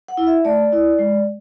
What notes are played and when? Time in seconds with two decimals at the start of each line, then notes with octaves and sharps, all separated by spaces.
0.08 F#5
0.18 E4
0.27 E5
0.45 A3 D5
0.73 E4
0.99 G#3